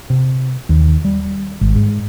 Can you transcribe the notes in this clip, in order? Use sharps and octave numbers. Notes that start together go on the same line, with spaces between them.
C3
D#2
G3
G#1
G#2